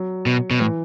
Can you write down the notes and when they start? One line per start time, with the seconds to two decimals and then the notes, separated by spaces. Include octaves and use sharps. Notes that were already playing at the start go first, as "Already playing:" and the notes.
Already playing: F#3
0.26 B2
0.51 B2
0.60 A2 E3